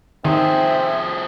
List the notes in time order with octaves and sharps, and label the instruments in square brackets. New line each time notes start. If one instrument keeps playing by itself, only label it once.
[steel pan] D#3 [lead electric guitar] F3 G#4 [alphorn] C4 [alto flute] E5